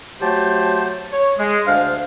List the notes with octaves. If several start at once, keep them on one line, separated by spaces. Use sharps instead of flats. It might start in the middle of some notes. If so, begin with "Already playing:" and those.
F#3 A3 G4 C5 G5 A5
C#5
G#3
D2 D4 C5 F5